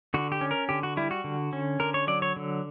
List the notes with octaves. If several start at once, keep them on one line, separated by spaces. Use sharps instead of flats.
D3 F#4
G4
C#4
A#4
D3 G4
F#4
G3 E4
F#4
D3
C#4
D3 A#4
C#5
F#3 D5
C#5
D3